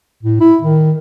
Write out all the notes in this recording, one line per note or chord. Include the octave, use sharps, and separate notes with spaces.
A2
E4
D#3